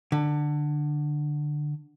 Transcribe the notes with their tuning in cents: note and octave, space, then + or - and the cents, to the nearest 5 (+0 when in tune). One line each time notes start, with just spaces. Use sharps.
D3 +15